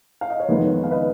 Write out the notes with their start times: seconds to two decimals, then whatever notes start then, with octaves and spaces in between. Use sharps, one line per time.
0.21 F5
0.30 D#5
0.40 C#5
0.48 F2 D#3 G#3 B3 G#4 B4
0.84 F5
0.91 B4 D#5